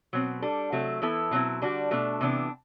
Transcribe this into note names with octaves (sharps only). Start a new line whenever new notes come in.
B2 F#3 C4
G3 D4 A4
C3 F#3 A3
E3 B3 E4 A4
B2 F#3 C4 E4
D3 G3 D4 F#4
B2 A3 D4
C3 E3 B3 D4